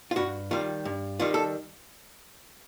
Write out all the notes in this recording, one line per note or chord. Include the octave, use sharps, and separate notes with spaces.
F4
G2 F#4
D#3 G3 F4
G2
D#3 G3 F4
A4